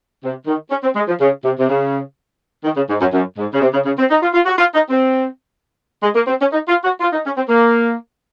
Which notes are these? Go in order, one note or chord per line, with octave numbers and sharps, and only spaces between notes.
C3
D#3
C#4
C4
G#3
F3
C#3
C3
C3
C#3
D#3
C#3
G#2
F#2
F#2
G#2
C#3
C3
C#3
C#3
C4
D#4
F4
F4
F#4
F4
D#4
C4
G#3
A#3
C4
C#4
D#4
F4
F#4
F4
D#4
C#4
C4
A#3